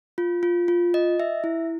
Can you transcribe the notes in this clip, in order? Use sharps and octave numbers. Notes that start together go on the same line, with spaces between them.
F4
F4
F4
D#5
E5
E4